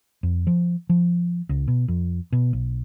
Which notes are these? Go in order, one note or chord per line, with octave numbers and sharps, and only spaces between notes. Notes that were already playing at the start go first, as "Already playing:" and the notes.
F2
F3
F3
C#2
B2
F2
B2
B1